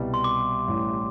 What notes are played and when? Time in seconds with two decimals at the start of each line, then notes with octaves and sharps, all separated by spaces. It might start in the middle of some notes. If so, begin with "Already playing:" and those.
Already playing: C2 B2 G3
0.14 C6
0.24 D6
0.67 A1 A2 G3